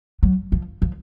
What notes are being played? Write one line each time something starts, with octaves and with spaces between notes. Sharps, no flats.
F#3
F3
F3